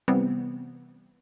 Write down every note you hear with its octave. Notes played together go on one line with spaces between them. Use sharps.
C3 E3 G3 B3 C4